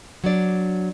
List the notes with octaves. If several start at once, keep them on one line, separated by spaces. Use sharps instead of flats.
F#3 D4 D5